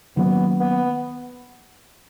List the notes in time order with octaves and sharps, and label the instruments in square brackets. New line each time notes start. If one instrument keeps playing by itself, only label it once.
[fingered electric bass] D#3 F#3 A#3 C#4 [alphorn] B3
[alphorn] B3